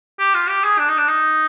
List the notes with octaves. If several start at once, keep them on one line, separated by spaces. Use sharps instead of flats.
G4
F4
G4
G#4
D4
D#4
D4
D#4